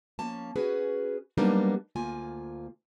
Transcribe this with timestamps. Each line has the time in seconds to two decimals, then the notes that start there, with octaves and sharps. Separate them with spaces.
0.19 F3 A#3 C#4 A5
0.56 C#4 F#4 G#4 B4
1.38 F#3 G3 A#3 B3 D4 D#4
1.96 D2 A#3 F4 G#5